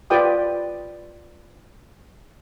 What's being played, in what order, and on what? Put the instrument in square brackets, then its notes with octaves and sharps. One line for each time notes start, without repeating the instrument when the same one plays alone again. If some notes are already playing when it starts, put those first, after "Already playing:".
[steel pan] F4 G4 B4 D5 G5 D#6